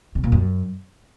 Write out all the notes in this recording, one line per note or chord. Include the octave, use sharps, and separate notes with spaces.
C3
A#2
F#2